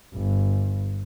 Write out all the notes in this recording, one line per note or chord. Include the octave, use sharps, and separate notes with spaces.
G1